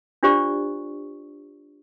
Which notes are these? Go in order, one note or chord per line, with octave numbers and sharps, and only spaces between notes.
D4 F4 G4 C5 D5 C#6